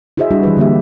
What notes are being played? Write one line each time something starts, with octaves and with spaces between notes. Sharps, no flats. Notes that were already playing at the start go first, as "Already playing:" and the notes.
E4 F#4 G#4 C5 D#5 E5
G3 D4 E4 F#4
E3 G3 B4
D3 A#3 G4 E5